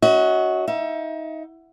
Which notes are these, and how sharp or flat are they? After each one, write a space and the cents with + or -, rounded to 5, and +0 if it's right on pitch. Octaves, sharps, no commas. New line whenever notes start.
C#4 +40 F#4 +0 D#5 +45
D#4 +25 E5 +20